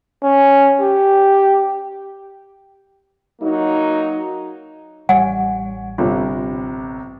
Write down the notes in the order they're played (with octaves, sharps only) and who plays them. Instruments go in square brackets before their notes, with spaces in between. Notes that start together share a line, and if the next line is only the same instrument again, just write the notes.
[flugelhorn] C#4
G4
[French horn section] F#3 A#3 D#4
[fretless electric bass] A1 G3 [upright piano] C#5 [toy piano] F#5 G#5
[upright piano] G1 C3 [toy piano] F4